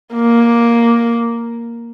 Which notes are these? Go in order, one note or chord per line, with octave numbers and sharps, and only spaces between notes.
A#3